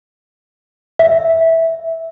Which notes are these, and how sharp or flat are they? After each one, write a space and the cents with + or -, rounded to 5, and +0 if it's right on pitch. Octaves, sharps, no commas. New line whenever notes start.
E5 -10